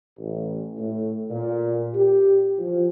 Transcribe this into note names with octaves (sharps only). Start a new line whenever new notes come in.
A1
A2
A#2
G4
F3